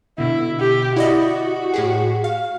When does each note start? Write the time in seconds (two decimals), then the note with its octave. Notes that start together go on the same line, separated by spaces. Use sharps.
0.18 B2 D3 E4
0.60 G4
0.96 E4 F#4 D5 D#5
1.74 A2 G4 G#4
2.24 F5